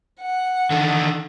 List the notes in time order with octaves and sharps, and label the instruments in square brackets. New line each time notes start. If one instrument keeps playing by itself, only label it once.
[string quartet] F#5
[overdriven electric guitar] D3 D#3